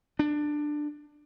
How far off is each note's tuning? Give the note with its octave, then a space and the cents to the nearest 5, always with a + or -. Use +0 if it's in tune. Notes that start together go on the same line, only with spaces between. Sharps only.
D4 +15